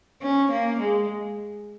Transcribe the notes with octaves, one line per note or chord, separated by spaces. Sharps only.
C#4
A#3
G#3